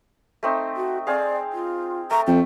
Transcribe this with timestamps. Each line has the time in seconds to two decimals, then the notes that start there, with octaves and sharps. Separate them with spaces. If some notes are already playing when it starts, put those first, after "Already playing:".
0.43 A3 C4 D#4
0.76 F#4
1.07 C4 G#4 D5 F5
1.53 F4
2.11 A3 A#5
2.27 F2 G5